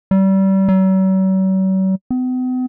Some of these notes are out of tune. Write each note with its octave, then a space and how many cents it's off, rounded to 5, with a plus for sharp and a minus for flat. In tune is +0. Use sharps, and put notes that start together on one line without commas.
G3 -30
F#3 +45
B3 +45